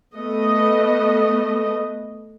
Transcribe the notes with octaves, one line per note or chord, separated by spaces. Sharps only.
A3 B3 D#5